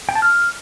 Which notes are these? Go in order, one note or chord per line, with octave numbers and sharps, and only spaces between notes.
G5
A5
F6